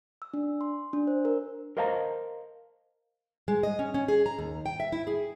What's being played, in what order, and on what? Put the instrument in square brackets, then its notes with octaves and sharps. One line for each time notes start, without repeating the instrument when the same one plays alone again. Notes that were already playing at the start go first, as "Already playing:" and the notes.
[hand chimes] E6
D4
C6
D4
C5
A#4
[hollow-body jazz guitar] A#4 C5 D#5 F5 A5 A#5
[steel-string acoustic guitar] G#3
D#5
C#4
C#4
G#4
A#5
D#2
G5
E5
E4
G#4